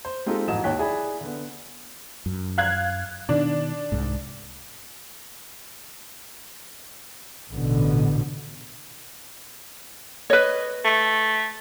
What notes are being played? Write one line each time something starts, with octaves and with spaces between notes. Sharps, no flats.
C5
G#3 C4 D#4 F4 G4 A4
A1 F2 G#2 F#3 D#5 E7
D#2 D#4 C#5 G5 F#6 B6
E4 G#4 D5 B5
D3 B3
F#2
F5 F#6 G#6
B2 D#3 D4
C2 G#2
A1 B2 D3
B4 C#5 D#5
A3